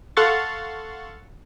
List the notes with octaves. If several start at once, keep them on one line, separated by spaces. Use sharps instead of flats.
A4 F5 F#5 C6 C#6 A6